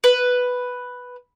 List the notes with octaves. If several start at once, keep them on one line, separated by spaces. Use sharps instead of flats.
B4